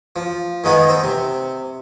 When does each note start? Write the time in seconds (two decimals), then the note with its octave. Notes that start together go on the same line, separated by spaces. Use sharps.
0.16 F3
0.64 D#3 G#3 B3 D#4
0.89 C4
1.04 C3